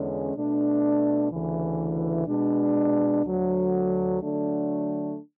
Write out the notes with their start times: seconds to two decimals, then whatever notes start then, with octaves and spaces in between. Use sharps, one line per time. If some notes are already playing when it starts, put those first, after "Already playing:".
Already playing: E2 D3 G#3 C#4
0.33 B2 A3 D4
1.30 D2 C#3 E3
2.27 B2 G#3 D4
3.24 D2 D3 F#3
4.21 D3 F#3 A3 D4